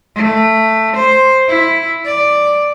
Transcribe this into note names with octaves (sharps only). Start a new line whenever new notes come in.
A3
C5
E4
D5